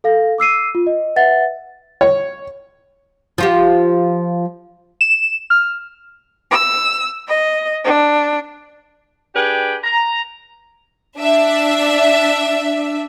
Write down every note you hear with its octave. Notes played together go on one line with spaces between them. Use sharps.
A4 F5 A#6
D6 E6 C7 D#7
F4
D#5
B4 E5 F#5 A6
C#5
F3 F4 G4
E7
F6
E6
D#5
D4
D4 G4 G#4 B4 G5
A#5
D4 E5